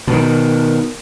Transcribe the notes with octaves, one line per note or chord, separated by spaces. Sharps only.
B2 D#3